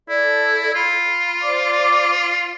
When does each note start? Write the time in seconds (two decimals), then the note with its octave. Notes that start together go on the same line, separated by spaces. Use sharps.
0.09 E4 A4 D5
0.75 F4 B5
1.41 C5 D5 D6